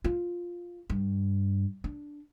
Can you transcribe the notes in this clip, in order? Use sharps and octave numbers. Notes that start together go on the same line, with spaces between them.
F4
G2
D4